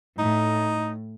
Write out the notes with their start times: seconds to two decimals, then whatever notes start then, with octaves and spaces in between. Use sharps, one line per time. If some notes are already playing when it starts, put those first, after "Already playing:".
0.19 A2 D#4